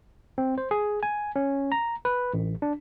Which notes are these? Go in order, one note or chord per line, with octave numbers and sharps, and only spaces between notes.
C4
C5
G#4
G#5
C#4
A#5
B4
A1
D4